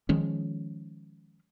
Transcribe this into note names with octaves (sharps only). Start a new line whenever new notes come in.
D#3 F3 G#3 C#4